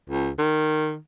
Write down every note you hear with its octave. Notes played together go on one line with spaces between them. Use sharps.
C#2
D#3